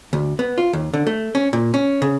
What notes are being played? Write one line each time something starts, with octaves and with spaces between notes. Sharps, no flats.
D2
B3
F4
D#2
D3
A3
C#4
A#2
C#4
C#3